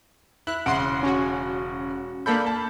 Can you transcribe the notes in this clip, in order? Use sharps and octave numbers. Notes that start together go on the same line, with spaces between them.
E4 F#6
E1 C#3 F#5 C6 D7
C#4 F#4
A#3 D4 A4 B5 G6
A5